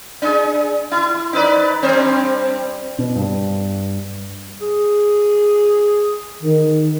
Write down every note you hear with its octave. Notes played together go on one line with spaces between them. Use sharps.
D4 G#4
E4
D#4 B4 D5
G2 C4 C5
B2
G2
G#4
D#3